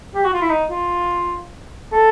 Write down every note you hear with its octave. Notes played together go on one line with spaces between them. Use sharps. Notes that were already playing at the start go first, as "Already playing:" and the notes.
G4
F#4
F4
E4
D#4
F4
A4